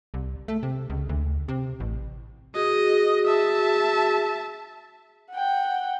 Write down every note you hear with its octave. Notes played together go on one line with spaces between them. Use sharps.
C2
A3
C3
C#2
D2
C3
A1
F#4 G#4 D#5
E5 A5
F#5 G5